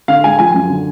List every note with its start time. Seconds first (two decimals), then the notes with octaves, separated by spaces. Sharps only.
0.08 D3 F5
0.24 G#3 G#5
0.39 F3 G#5
0.54 F#2
0.70 D3